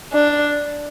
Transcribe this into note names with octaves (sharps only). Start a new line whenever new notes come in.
D4